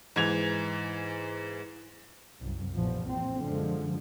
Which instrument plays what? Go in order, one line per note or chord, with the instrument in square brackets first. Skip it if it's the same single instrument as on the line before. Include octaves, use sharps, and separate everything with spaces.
[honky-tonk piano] G#2 E3 G#6 F7
[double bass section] C2 F#2
A#1 E2 B2 F3
A#2 C4
F#2 D3 F3 G#3